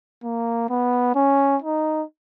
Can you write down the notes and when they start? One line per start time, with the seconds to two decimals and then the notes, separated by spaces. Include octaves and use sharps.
0.24 A#3
0.70 B3
1.15 C#4
1.62 D#4